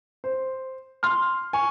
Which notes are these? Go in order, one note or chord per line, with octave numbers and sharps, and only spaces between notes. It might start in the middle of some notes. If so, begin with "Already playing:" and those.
C5
C6 F6
G#5 C#6